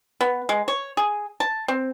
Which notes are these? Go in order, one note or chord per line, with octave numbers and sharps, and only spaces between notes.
B3
G#3
C#5
G#4
A5
C4